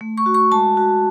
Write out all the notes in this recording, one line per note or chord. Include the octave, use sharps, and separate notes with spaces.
A3
C#6
F#4
C#6
G#3 A5
F#4